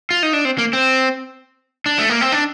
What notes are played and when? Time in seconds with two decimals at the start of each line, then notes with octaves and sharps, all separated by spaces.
0.11 F4
0.23 D#4
0.33 D4
0.45 C4
0.58 A#3
0.73 C4
1.86 D4
1.99 A3
2.09 A#3
2.21 C4
2.32 D4